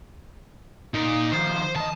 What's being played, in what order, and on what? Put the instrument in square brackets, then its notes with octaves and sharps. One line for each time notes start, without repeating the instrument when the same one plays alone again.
[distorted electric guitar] A#2 D5 [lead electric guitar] D#4
[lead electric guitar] D#3 F3 [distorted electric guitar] C5
[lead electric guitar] D#3 D#5 [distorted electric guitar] A5